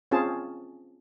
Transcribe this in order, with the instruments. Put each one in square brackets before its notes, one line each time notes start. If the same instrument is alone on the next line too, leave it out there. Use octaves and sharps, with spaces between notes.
[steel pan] C4 C#4 F4 G#4 A5